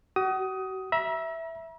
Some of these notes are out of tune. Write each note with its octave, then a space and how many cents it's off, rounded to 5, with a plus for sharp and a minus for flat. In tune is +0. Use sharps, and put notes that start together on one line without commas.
F#4 +40 D#6 +10
E5 +0 A#5 +45